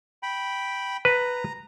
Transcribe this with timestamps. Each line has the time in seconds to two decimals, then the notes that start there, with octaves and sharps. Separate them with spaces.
0.23 G5 B5
1.05 B4 A#5